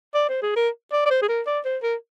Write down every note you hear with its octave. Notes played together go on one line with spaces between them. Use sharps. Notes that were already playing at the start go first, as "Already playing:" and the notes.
D5
C5
G#4
A#4
D5
D5
C5
G#4
A#4
D5
C5
A#4